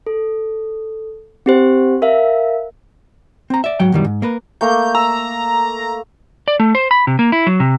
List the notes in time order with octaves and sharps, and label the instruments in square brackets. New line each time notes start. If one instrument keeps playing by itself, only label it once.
[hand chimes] A4
C4 G4 C5
A#4 E5 F5
[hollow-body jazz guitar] C4 A#5
D5 E5
G#2 F#3 F#5 G5
F#2 B2 D#3 E3 G3
G#2
A#3 A#4 B4
[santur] A3 A#3 A#5 [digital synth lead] G6
[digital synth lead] A#5 [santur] E6
[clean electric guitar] D5
A3
C5
B5
C3
A#3
E4
F#3
C3